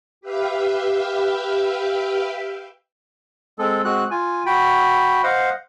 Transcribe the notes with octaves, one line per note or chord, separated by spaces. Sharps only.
G4 B4 E5 F5 G5
G#3 C4 A4
G#3 C4 F#4 F#6
F4 G#5
F#4 G5 B5
C5 D#5 F5 F#5